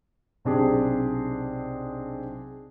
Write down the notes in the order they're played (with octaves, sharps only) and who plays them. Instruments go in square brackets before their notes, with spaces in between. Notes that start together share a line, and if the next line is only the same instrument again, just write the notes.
[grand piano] B1 C3 C4 D4 G4 G#4